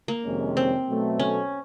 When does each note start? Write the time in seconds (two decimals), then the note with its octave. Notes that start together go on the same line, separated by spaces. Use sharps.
0.08 A#3
0.24 F2 C3 D#3 G#3 C#4
0.57 C4
0.88 B2 F#3 A3
1.19 C#4